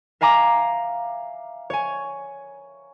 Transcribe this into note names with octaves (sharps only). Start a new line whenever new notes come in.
E5 F5 G#5 A#5 D6
C#5 G#5